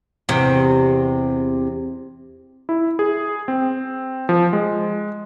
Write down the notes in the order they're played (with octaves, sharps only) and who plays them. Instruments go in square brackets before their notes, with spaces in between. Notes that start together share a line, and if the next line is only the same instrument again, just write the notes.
[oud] E2 C3
[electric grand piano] E4
G#4
C4
F3
G#3